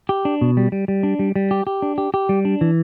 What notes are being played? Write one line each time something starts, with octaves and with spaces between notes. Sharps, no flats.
G4
D4
B2
G3
G3
G3
D4
G3
G3
G4
G4
D4
G4
G4
G3
D4
E3